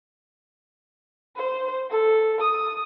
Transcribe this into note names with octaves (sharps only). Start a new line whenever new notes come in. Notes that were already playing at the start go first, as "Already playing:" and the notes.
C5
A4
D#6